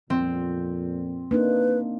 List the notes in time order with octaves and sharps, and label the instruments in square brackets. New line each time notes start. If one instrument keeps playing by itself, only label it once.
[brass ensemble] F2 A#2 [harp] C4
[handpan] A#3 D4 D#4 [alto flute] B4